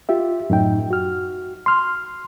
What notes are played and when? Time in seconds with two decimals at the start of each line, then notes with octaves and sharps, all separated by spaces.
0.09 F4 G4 E5
0.50 F#2 A2 D#4 G5
0.91 F#4 F6
1.66 C6 F6